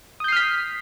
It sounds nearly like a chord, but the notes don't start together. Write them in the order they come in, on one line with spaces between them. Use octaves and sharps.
D#6 G6 C7 F6 B6